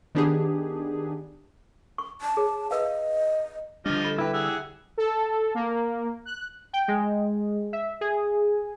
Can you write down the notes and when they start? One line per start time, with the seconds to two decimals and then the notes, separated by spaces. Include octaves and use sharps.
0.15 D#3 B3 D4 G4 G#4
1.98 C#6
2.21 A5
2.37 G#4 C#5
2.71 B4 D#5 F5
3.86 D3 F3 G3 D4 D#5 F6
4.05 A4 B5
4.18 E4 G4 B4
4.34 G#4 F#5 E6
4.98 A4
5.55 A#3
6.25 F#6
6.73 G5
6.88 G#3
7.73 E5
8.01 G#4